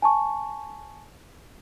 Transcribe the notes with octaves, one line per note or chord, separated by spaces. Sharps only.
G#5 A5 C#6